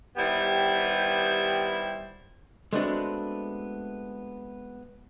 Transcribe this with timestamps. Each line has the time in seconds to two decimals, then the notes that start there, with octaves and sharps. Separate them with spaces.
0.17 D#3 G3 B3 E4 G4 C5
2.73 G#3 A3 B3 C4 D4 F#4